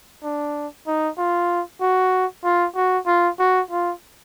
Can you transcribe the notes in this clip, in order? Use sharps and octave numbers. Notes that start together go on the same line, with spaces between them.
D4
D#4
F4
F#4
F4
F#4
F4
F#4
F4